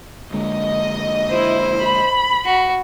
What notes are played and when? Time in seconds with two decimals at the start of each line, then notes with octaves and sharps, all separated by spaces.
0.33 D3 G#3 A#3 D#5
1.30 E4 C5
1.82 B5
2.45 F#4